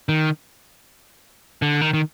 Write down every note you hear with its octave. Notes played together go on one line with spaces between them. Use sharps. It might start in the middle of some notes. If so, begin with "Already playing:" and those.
D#3
D3
D#3
D#3